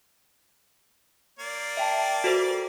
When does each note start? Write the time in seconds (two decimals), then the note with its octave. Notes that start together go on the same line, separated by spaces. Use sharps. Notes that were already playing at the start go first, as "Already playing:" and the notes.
1.39 A#3 D5
1.77 E5 G5 A5
2.24 F#4 A4 C5